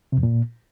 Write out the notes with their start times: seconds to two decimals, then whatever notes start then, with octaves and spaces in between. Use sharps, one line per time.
0.12 C3
0.18 F2
0.23 A#2